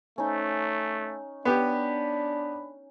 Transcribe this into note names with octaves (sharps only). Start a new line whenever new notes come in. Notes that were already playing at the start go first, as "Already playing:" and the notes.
A3 C#4 D#4
B3 D4 G4 B5